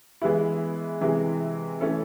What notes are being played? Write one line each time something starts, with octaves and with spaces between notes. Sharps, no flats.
E3 G#3 B3 E4
C3 E3 G#3
E3 A3 C#4 E4 A4